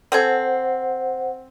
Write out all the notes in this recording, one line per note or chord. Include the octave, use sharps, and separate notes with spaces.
C4 A4 C5 F#5 G#5